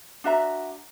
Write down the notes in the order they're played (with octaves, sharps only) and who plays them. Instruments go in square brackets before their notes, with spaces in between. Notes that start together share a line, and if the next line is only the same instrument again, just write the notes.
[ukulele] D4 F#4 E5 A#5